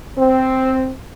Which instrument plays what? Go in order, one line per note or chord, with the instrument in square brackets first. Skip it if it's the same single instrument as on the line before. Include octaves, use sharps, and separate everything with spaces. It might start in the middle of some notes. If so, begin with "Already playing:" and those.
[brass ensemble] C4